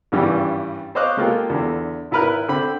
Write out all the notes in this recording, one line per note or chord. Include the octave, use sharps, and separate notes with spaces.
G#1 G2 C#3 E3 G3 G4
C5 C#5 D#5 F5 D6 F#6
G#3 A#3 F4 G4 A4
E2 D3
G#1 E4 A#4 B4 F6 F#6
D3 C4 B5